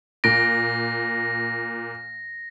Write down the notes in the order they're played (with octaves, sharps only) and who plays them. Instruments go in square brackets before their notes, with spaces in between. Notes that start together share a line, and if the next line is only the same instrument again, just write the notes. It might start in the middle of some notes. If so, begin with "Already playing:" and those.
[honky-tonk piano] A#2 D7 [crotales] A#6